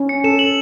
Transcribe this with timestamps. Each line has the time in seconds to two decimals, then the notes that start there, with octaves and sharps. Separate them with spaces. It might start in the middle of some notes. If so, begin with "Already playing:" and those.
Already playing: C#4
0.09 C#7
0.24 A4 E7
0.39 F#7